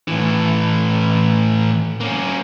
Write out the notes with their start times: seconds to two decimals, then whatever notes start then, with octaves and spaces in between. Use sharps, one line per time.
0.08 A2 E3
2.01 A#3 C#4